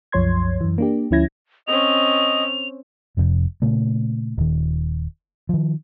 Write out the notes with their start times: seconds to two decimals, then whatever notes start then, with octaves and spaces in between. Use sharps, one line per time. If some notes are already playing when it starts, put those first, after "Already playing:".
0.12 C2 F#2 F3 C#5 C6 G#6
0.61 F#2 E3
0.78 A#3 D4 G4
1.11 D2 F3 C#4 E4 G#6 A#6
1.68 C4 C#4 D#5 F7
3.17 F1 F2 A2 C3
3.62 A#2 C#3 A3
4.38 D#1 D#3
5.49 D#3 F3